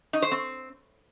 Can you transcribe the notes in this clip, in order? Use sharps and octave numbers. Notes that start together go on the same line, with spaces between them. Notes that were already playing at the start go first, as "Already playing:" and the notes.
D#4
C5
C4